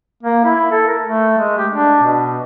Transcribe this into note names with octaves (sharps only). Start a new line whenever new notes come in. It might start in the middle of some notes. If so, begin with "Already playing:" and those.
A#3
E4
A4
A#4
A3
G#3
G4
D4
B2